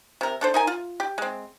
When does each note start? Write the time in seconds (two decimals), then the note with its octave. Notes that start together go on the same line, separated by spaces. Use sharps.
0.21 C3 A#4
0.41 D4 A4 C5
0.54 D#4 A#4 G#5
0.67 F4
1.00 G4
1.18 G#3 C4